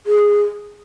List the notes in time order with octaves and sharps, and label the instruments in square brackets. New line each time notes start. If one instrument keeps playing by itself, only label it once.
[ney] G#4